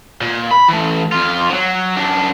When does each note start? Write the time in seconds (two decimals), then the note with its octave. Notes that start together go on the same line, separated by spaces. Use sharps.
0.21 A#2
0.51 B5
0.68 E3 A3
1.12 F2 F4
1.50 F3 F#3
1.96 F#2 D4